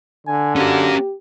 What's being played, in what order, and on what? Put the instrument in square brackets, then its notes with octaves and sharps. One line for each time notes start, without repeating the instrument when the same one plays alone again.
[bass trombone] D3 [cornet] G#5
[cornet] A#3 [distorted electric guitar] C#4 F#4 [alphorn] G4